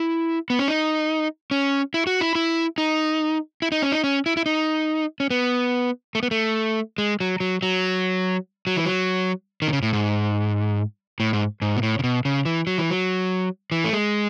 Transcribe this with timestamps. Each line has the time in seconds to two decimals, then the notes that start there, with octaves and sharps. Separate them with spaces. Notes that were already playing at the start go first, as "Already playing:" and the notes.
Already playing: E4
0.50 B3
0.59 C#4
0.68 D#4
1.51 C#4
1.94 E4
2.07 F#4
2.21 E4
2.35 E4
2.78 D#4
3.62 E4
3.72 D#4
3.82 C#4
3.92 D#4
4.04 C#4
4.26 E4
4.37 E4
4.46 D#4
5.20 C#4
5.30 B3
6.15 A3
6.23 B3
6.31 A3
6.98 G#3
7.20 F#3
7.40 F#3
7.63 F#3
8.67 F#3
8.76 E3
8.85 F#3
9.62 D#3
9.68 B2
9.73 C#3
9.82 A2
9.93 G#2
11.20 A2
11.33 G#2
11.62 G#2
11.76 B2
11.83 A2
11.99 C#3
12.04 B2
12.25 C#3
12.45 E3
12.67 F#3
12.78 E3
12.90 F#3
13.72 E3
13.84 A3
13.93 G#3